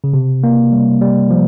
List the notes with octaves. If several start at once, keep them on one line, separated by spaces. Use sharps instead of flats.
C#3
C3
A#3
G3
G3
F3